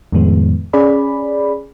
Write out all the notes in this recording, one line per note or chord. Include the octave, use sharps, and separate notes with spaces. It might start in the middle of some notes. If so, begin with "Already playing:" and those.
F2 A2 D#3 G#3 B3
C#4 G#4 D5 B5